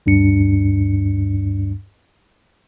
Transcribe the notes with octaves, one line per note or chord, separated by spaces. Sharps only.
D2 G2 D4 C#7